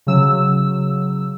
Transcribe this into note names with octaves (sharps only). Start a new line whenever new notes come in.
C#3 F#3 E6